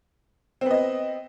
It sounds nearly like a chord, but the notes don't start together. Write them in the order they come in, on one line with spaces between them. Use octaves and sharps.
C4 B3 D#5